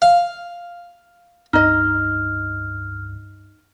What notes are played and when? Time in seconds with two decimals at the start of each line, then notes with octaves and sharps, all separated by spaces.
0.02 F5
1.53 C#2 G2 D#4 D#5 F6